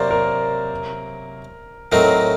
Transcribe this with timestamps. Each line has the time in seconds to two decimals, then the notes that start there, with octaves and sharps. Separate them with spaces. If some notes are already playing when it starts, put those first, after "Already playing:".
Already playing: C3 F#3 A#3 A#4 C5 D5
0.11 A#4
1.92 A2 F#3 C4 D#4 A#4